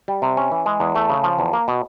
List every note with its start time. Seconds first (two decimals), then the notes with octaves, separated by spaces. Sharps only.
0.08 G3
0.22 C3
0.37 C#4
0.52 E3
0.66 G#3
0.80 E2
0.95 A3
1.10 C#3
1.24 F3
1.39 E2
1.53 A#3
1.68 B2